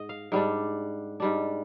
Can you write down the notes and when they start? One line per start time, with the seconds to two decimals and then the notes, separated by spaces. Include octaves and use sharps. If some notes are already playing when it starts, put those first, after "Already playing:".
Already playing: G#2 D#5
0.09 F5
0.32 G#2 G3 D4
1.20 G#2 G3 D4